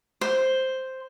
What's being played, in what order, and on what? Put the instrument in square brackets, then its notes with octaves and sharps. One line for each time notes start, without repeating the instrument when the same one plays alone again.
[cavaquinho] C5